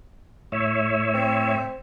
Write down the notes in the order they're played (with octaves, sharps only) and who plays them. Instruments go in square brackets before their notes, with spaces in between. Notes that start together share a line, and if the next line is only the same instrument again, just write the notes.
[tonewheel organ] A2 C#5 E5
[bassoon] C4